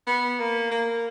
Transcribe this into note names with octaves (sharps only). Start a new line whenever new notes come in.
B3
A#3
A#3